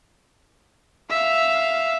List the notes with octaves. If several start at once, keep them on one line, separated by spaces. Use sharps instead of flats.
E5 F5